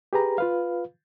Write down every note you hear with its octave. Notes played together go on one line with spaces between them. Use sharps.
G4 G#4 B4 A#5
F4 B4 F5